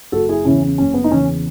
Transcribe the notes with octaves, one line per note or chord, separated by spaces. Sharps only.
F#1 F#4 A4
E4 G#4
E2 C#3 C#4 E4
C#4
F#1 C#4
B3
D#4
E2 C#3 C#4